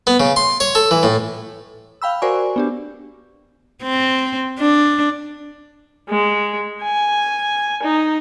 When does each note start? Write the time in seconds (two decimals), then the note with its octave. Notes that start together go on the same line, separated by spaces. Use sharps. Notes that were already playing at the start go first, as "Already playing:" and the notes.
0.07 B3
0.20 C#3
0.36 C6
0.60 C#5
0.75 A4
0.91 E3
1.03 A2
2.02 F5 G5 B5 E6
2.22 F#4 A#4 C5 D5 G#5 C#6
2.56 B3 D4 G4
3.83 C4
4.59 D4
6.09 G#3
6.83 G#5
7.83 D#4